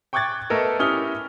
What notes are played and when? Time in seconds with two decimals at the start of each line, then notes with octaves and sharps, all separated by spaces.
0.13 G5 C#6 D6 F#6 G#6 A6
0.50 A3 B3 A4 A#4 D#5
0.79 C#4 E4 G4 D#6 F6 G7